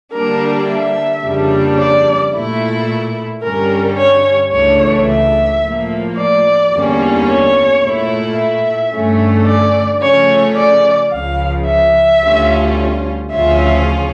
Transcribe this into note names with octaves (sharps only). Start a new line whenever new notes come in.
D3 G3 A#3 D4 A#4
E5
F2 C#3 G3 A#3 D4
D5
A#2 A3 E4
G2 D3 G3 C#4 A#4
C#5
C#2 C#3 E3 A3 D4 C#5
E5
A2 F3 A#3
D5
E2 D3 G3 A#3 C#4
C#5
A#2 A3 E4
E5
G2 D3 A3 C#4
D5
C#3 F3 A3 C#4 C#5
D5
C#2 C#3 F3 F5
E5
D2 D3 G3 C#4 F4
D2 C#3 F3 C#4 F4 E5